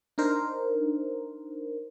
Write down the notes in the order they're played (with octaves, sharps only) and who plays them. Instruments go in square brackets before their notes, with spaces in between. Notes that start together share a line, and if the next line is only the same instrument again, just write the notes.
[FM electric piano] D4 D#4 A#4 C5